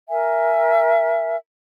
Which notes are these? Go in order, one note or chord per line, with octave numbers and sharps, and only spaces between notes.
A#4 E5 G#5